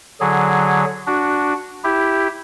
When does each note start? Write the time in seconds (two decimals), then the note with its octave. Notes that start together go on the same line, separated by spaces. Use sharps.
0.20 D3 F#3 G#4
1.07 D4 F#4
1.84 E4 G4